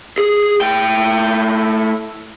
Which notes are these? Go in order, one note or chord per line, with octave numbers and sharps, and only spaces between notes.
G#4
A2 G5